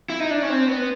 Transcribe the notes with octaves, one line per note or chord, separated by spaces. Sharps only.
E4
D#4
D4
C#4
C4
B3